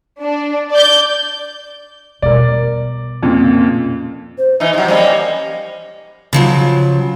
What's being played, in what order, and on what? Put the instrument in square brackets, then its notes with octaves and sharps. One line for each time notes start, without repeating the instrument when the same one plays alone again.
[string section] D4
D5 G6
[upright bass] B2 G3 [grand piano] A#4 D5
[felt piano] F2 A#2 C#3
[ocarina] C5
[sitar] E3 D#4 [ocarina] E5
[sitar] C3 F#3 [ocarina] D#5
[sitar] G3 A#3 C#4 [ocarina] D#5
[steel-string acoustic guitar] C#3 F3 F#3